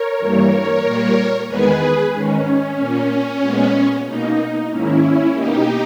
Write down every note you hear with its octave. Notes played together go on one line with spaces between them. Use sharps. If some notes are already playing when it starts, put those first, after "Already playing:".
Already playing: A#4 C#5
G2 E3 G3 A#3
A#2 G3 A#3
E2 D#3 G#3 B3 G#4 B4
G#2 D#3 G#3 C#4
A#2 A#3
A#2 G#3 B3
B2 A#3 D#4
G#2 D#3 A#3 C#4 E4
B2 A#3 D#4 G4